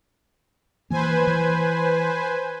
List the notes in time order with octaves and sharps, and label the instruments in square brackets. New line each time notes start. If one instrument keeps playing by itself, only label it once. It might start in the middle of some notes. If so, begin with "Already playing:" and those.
[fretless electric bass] E3 A#3 [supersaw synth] B4 C5 G#5
[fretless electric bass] E3